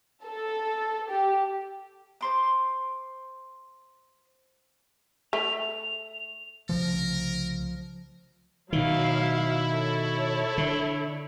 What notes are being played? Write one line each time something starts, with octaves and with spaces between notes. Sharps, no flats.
A4
G4
C5 C6 D6
A3 F7
C2 C#3 F3 A3 A#4
B2 D#3 F#3 E4 F5
A4 C#5
D3